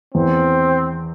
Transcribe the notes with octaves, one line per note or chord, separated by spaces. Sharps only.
E2 C4